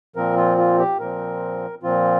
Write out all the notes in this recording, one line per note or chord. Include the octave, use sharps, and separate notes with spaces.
A#2 F3 C4 A#4
F4
F4
G4
A#2 F3 C4 A#4
A#2 F3 C4 F4